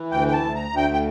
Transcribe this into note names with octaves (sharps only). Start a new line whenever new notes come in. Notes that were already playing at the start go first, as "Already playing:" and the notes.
Already playing: E3
D2 G5
G5
A5
D2
A#5
D2
G5
G5